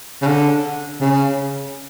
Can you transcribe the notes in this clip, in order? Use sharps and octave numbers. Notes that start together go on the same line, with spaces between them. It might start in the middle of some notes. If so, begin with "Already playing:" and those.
C#3
D3
C#3